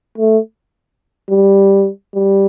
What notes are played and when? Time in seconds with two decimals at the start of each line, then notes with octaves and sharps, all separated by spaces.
0.18 A3
1.30 G3
2.14 G3